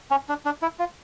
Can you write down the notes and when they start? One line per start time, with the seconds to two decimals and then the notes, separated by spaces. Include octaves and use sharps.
0.11 C#4
0.29 D4
0.45 D4
0.62 E4
0.79 F4